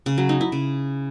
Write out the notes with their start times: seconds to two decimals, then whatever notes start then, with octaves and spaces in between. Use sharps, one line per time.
0.06 C#3
0.18 F#3
0.29 D#4
0.41 E4
0.52 C#3